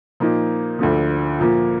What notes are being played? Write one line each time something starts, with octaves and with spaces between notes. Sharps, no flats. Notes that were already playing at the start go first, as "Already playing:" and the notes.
A#2 F3 A#3 D#4
D2 D3 F3
A#2 F3 A#3